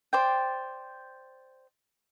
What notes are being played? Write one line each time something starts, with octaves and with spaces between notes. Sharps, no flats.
C5 D5 G5